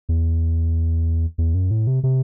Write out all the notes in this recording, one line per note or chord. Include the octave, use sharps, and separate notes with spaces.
E2
E2
F#2
A2
C3
C3